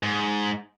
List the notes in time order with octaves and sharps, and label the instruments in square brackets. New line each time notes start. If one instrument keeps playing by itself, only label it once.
[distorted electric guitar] G#2